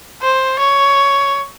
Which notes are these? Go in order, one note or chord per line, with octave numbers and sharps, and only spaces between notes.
C5
C#5